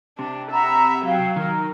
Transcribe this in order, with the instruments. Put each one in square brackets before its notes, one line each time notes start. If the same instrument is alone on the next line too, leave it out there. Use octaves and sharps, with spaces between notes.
[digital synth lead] C3 [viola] D4
[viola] E5 [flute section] F#5 A#5 B5
[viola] F#3 [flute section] F5 G5
[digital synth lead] D#3 [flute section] D#4 A#4